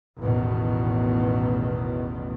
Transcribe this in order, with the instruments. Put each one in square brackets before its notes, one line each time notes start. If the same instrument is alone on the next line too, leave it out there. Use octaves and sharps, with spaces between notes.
[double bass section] A1 E2 B2 D#3